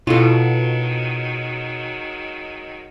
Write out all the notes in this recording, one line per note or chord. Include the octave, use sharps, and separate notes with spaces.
B2 D#3 F#3 G#3 E4 F4 A4